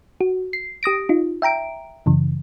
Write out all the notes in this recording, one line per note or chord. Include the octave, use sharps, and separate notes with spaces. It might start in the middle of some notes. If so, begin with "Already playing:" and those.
F#4
C7
G4 D#6 A#6 D7
D#4 F4
E5 G5 A#5 D7
F#2 C#3 E3